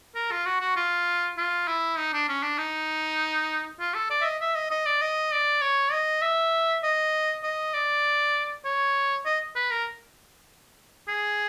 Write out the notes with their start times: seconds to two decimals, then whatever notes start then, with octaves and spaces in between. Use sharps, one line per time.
0.15 A#4
0.31 F4
0.46 F#4
0.61 F#4
0.76 F4
1.38 F4
1.68 E4
1.98 D#4
2.13 D4
2.28 C#4
2.43 D4
2.58 D#4
3.80 F4
3.94 A4
4.10 D5
4.21 E5
4.25 D#5
4.41 E5
4.56 D#5
4.71 D#5
4.86 D5
5.01 D#5
5.32 D5
5.61 C#5
5.92 D#5
6.22 E5
6.84 D#5
7.44 D#5
7.74 D5
8.65 C#5
9.25 D#5
9.56 B4
9.71 A#4
11.08 G#4